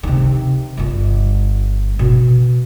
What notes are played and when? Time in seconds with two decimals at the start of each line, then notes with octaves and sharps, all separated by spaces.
0.03 C3 D#3
0.77 G1 F4
1.99 B2